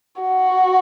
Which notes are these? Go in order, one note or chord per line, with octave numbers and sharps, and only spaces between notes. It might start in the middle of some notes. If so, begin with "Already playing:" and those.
F#4